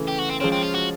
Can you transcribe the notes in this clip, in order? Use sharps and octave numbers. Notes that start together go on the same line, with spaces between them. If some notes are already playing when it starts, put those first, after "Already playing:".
Already playing: C#3 E3 A3
G4
F#4
C4
F3 G#3 C4 C#4
C4
F4
F#4